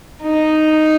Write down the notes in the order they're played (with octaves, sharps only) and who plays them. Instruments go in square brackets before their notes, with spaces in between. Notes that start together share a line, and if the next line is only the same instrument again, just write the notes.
[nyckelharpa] D#4